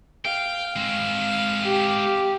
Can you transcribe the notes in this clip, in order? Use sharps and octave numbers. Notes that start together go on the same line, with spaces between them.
F5 G5
G#3 C4
G4